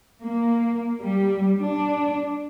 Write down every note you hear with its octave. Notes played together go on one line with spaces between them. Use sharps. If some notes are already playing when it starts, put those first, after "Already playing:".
A#3
G3
D4